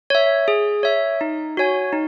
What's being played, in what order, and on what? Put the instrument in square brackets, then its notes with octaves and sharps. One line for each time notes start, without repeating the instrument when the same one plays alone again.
[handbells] C#5 E5
G#4
C#5 E5
D#4
F#4 C#5 G#5
D#4